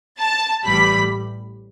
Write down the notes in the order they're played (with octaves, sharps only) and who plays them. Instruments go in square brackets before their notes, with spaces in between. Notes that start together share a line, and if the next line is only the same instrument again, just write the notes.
[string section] A5 A6
A1 A2 E3 G3 B5 B6